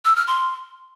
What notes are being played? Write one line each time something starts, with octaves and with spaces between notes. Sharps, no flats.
E6
F6
C6